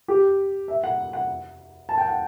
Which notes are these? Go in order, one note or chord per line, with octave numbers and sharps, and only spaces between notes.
G4
E5
F#5
F#5
A5
G5
F#5